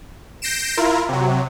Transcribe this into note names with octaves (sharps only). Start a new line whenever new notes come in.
G6 A#6 C7 D7 E7
E4 F4 A#4
C3 F#3